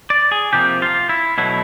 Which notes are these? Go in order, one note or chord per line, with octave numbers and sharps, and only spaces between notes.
D5
G#4
C3 F3 A#3 G4
F4
E4
B2 F#3 A3 E4